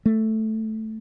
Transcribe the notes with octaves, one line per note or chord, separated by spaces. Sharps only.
A3